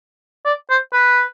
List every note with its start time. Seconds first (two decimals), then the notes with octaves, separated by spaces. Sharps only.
0.46 D5
0.70 C5
0.93 B4